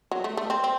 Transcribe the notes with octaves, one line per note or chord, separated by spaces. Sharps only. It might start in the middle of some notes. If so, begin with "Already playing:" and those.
F#3
A3
A3
C4
C4